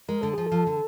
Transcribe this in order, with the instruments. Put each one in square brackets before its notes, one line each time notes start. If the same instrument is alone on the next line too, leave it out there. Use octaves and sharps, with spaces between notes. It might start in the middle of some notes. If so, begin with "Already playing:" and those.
[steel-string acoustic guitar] G#3 [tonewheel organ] A#4
[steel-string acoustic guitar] D3 [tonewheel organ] A4
[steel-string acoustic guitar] F3 [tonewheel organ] G#4
[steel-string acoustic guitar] F3 [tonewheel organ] A4
[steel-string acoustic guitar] D3